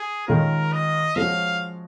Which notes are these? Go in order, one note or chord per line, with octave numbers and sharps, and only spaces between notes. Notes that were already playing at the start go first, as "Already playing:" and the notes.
Already playing: G#4
D#3 G#3 C#4 F4 A#4
D#5
F3 G#3 C#4 F#4 F5